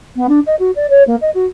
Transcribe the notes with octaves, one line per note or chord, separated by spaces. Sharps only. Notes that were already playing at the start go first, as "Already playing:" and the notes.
B3
D4
D#5
F#4
D5
C#5
A#3
D#5
F#4